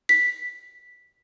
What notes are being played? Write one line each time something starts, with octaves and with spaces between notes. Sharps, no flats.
B6